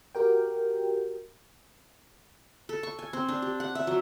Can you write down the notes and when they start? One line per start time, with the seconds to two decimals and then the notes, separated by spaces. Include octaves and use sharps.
0.15 F#4 G4 A#4 G5
2.69 A4
2.83 C#6
2.99 G#5
3.13 C4
3.29 D4
3.42 G4
3.60 F#5
3.75 E5
3.87 F#3